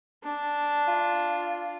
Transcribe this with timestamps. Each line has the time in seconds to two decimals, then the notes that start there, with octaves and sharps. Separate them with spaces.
0.24 D4
0.88 F4